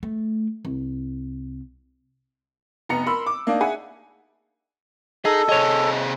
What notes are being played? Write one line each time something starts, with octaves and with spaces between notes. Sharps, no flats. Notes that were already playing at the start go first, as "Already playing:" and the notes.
A3
C2
F1 B3 A#5 C#7
A#4 B5 C6 E6
D6
A#3 D4 D#4
G#4 E5 F#5 G#5
D#4 G#4 A4 D#5
C3 G#4 C#5 D#5